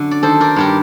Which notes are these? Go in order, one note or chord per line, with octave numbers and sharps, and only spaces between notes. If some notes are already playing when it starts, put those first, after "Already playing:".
Already playing: F#2 D3
D5
D#3 A4 C5
A#4 D5
G2 G4 A#4